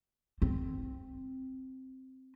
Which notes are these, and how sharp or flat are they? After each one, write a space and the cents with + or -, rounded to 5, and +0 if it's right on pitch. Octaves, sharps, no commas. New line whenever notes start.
C4 +0